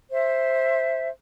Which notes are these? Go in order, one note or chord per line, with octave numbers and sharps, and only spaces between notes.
C5 E5